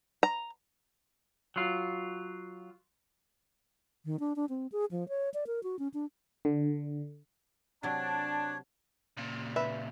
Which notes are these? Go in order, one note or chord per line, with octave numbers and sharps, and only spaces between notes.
A#5
F#3 F4
D#3
D4
D4
C4
G#4
F3
C#5
D5
A#4
F#4
C#4
D4
D3
C3 F#3 D4 C#5 A5
A#2 C#3
B4 E5